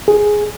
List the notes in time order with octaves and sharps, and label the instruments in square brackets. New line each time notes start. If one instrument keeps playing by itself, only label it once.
[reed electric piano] G#4